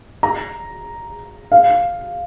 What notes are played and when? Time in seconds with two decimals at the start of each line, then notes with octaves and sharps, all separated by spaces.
0.23 A#5
1.52 F5